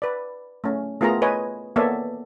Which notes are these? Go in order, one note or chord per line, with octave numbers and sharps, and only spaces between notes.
B4 D5
A3 C#4
A3 B3 F4 G#4 A#4 A#5
B4 C#5 D#5 G#5
A#3 B3 A4 C#5 D5 E5